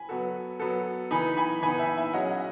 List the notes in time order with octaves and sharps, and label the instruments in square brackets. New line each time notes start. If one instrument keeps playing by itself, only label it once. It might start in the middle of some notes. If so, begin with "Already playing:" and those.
Already playing: [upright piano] G#5 B5
[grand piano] F#3 B3 F#4 A4
F#3 B3 F#4 A4
[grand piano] E3 B3 D#4 [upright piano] G#5 B5
[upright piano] G#5 B5
[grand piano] E3 B3 D#4 [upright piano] G#5 B5
[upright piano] E5 G#5
E5 G#5
[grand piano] F#3 C#4 G#4 [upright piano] D#5 F#5
[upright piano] F#5